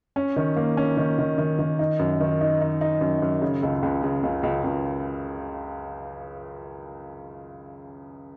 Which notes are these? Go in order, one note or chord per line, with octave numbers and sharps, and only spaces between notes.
C#4
D#3
A#3
C#4
D#3
D#3
D#3
D#3
D#4
F#2
D#3
D#4
D#4
D#4
F#2
F#2
C#3
C#2
C#2
C#3
C#2
C#2
C#2